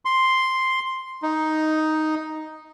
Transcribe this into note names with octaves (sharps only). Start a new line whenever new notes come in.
C6
D#4